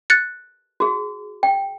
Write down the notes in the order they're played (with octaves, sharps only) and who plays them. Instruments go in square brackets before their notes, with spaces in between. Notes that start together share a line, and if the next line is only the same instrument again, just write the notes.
[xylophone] F#6 A6 C#7
[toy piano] F#4 G#4
G5